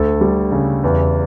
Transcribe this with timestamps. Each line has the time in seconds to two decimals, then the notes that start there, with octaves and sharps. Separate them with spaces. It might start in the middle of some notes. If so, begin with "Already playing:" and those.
Already playing: D2 A4
0.21 G3
0.52 C#3
0.84 E2